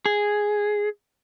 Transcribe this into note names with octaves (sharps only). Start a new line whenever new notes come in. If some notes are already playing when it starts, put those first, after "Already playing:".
G#4